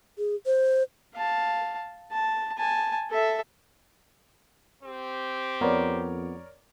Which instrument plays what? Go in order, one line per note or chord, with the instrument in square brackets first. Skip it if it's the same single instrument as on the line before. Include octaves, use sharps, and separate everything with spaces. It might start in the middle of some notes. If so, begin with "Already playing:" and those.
[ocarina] G#4
C5
[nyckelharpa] F5 A5
A5
G#5 A5
A4 E5
[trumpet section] C4 G4
[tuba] F2 [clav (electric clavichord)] B3 [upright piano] A#4 C#5 D5